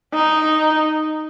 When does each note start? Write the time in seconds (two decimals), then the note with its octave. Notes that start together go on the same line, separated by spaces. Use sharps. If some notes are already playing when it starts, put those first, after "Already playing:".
0.14 D#4